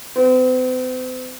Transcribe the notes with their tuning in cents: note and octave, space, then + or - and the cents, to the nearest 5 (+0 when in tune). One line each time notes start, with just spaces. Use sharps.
C4 -45